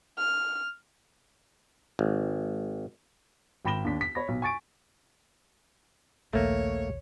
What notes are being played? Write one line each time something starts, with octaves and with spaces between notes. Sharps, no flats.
F6
G#1
G#1 G5 B5 A#6 E7 G7
D#2 D4 B6
B6
C#5 B5 A#6
B1
G#5 C#6 A6 D7
A#1 D#2 A3 A#3 C#5